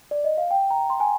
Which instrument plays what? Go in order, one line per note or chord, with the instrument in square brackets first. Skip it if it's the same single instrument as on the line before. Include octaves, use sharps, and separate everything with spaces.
[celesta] D5
D#5
F5
G5
A#5
C6
G#5